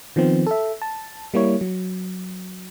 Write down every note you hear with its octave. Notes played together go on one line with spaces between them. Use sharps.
D#3 F3 B3 C4
A4 E5
A5
G3 A#3 E4 C#5
F#3